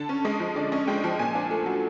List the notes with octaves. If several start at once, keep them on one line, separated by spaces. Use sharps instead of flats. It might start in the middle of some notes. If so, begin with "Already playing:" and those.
Already playing: D3 A5
C#4
G#3 D#5
F3
D3 D5
C#4 D#5
G#3 G5
F3
A#2 G#5
D4
A3
F#3